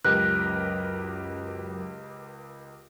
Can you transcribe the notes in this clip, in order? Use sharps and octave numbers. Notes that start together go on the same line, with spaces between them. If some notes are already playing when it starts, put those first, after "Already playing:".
C#2 F#2 G4 A#4 B4 F#6